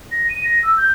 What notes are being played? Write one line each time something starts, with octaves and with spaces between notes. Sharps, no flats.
A#6
D#7
A#6
E6
G6